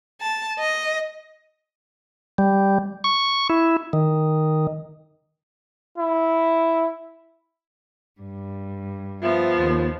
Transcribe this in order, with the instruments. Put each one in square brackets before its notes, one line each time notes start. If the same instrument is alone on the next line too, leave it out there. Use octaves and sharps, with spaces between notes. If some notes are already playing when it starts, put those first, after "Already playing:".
[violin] A5
D#5
[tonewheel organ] G3
C#6
E4
D#3
[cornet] E4
[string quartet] G2
[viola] F3 B3 [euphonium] F4 [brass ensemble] E5
[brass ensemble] D#2